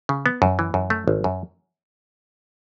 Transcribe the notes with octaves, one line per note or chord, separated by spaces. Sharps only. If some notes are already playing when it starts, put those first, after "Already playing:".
C#3
B3
F#2
E3
F#2
A3
G#1
F#2